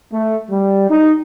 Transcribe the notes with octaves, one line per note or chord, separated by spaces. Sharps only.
A3
G3
D#4